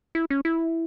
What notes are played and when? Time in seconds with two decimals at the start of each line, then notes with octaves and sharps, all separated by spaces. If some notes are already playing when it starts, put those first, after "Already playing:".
0.15 E4
0.30 C#4
0.45 E4